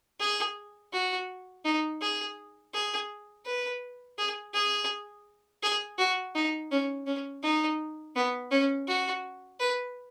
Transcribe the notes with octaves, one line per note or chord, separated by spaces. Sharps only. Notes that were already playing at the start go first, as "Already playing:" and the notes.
G#4
F#4
D#4
G#4
G#4
B4
G#4
G#4
G#4
F#4
D#4
C#4
C#4
D#4
B3
C#4
F#4
B4